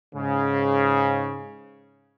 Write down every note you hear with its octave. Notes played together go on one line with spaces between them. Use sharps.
G#2 C#3